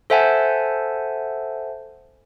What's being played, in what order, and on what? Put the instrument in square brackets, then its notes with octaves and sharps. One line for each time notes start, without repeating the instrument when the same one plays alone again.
[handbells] A4 C5 E5 F#5 G#5 A5